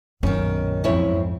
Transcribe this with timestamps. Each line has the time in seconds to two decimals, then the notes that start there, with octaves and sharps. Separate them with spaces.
0.23 B1 F#2 A#2 D#3 C#4
0.84 F2 G#2 C4 C#4 E4 C#5